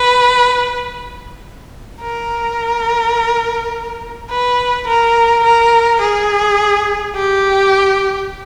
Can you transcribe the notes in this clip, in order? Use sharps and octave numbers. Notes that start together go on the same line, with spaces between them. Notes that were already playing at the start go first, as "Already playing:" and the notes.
Already playing: B4
A#4
B4
A#4
A#4
G#4
G4